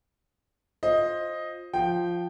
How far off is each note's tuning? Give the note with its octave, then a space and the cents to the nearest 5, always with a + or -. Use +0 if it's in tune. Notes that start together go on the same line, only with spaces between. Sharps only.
F4 +15 C5 +15 D#5 +5
F3 +0 G5 -5